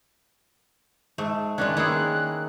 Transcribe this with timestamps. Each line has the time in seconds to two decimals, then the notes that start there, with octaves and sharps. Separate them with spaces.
1.18 G#2 A3
1.58 D#3 G#3 C#4 D4 F#6
1.77 D#3 A#3 E4 G#4